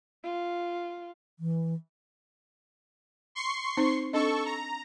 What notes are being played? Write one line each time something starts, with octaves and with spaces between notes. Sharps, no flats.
F4
E3
C6 C#6 C7
C4 D#4 C5
C4 D4 A4 D#5 C#6
A#5